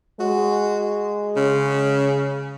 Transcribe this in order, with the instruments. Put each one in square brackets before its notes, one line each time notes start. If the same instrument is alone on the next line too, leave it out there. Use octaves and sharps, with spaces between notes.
[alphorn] G#3 [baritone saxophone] F#4
[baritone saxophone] C#3